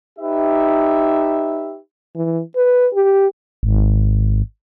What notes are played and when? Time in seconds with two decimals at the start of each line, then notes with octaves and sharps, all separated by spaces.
0.19 D#4 G4 B4 E5
2.16 E3
2.56 B4
2.94 G4
3.63 G#1